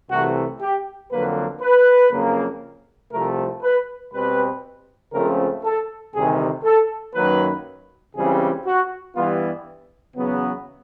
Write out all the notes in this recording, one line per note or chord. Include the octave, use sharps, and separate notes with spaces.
C2 C3 E3 A3 F#4
G4
F2 D3 F#3 A#3 B4
B4
F2 C#3 F#3 A#3
C2 C3 F3 A3 A#4
B4
B2 G3 C4 B4
C#2 C#3 F3 A3 C4 A#4
A4
D2 C3 D#3 G3 G#4
A4
F#2 D#3 F#3 A#3 B4
C#2 C#3 E3 G3 C4 G#4
F#4
G2 E3 G3 B3 F4
E2 C#3 F#3 B3